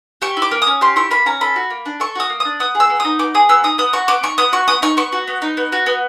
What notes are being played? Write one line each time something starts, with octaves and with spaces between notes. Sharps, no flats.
G4 C#6
E4
D6
A#3
D#6
C#4
G4 C6
E4 C#6
A#3 B5
C#4 A#5
A4 B5
F#4
A#3
D4
A4 C#6
F#4 D#6
A#3
D4 D#6
B3 D#6
G#4
E6
B3
D#4 D#6
B3 D6
G#4 D#6
B3 E6
D#4 D#6
B3 D#6
F#4 C#6
B3 D6
D#4 C#6
B3 D#6
F#4 C#6
B3 D#6
D#4 C#6
B3 C#6
F#4
B3
D#4
B3
F#4
B3